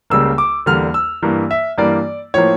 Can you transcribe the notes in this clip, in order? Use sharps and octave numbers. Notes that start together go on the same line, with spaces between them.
C#2 C#3 G3 A#3 E6
D6
E2 D3 G3 A#3 F6
E6
G2 E3 A#3
E5
G2 E3 G3 A#3 D5
A2 F3 A#3 C#5